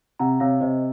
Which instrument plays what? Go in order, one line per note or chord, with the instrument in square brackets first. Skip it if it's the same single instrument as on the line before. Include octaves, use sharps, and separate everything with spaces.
[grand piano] C3 [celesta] F#5 A#5
[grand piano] C3 [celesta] C#5 F5
[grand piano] C3 [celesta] C5 D#5